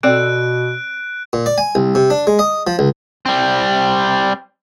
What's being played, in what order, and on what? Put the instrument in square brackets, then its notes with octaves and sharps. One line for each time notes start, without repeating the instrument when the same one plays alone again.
[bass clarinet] B2 [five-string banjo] C4 A4 D5 [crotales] F#6 D7
[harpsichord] A#2
D5
G#5
C2
C3
D4
G#3
D#5
F3
C#2
[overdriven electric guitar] G3 C4